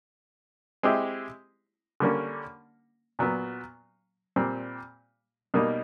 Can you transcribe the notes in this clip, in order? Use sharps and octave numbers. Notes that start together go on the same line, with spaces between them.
G#3 C4 E4 G4
D3 G3 A#3 C#4
A#2 F#3 B3
A#2 G3 C4
B2 G3 A#3 D#4